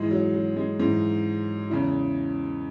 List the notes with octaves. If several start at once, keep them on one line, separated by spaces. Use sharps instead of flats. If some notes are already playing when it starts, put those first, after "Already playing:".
Already playing: G#2 E3 G#3
F#3
F#3
G#3
G#2 E3
E2 C#3 E3